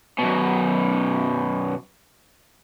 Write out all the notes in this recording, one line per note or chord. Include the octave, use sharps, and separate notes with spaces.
F#2 B2